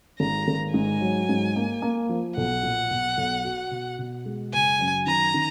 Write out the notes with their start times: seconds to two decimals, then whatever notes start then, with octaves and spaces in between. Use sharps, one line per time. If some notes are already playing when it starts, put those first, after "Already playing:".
0.20 G#1 A#5
0.48 G#1
0.74 G#2 G#5
1.01 F#3
1.29 G#2
1.56 A#3
1.82 A#3
2.09 F3
2.37 B1 F#5
2.63 A#2
2.90 B1
3.18 B1
3.45 F#4
3.71 B2
3.99 B2
4.25 G#3
4.53 F#1 G#5
4.80 F#2
5.06 D#3 A#5
5.34 D#3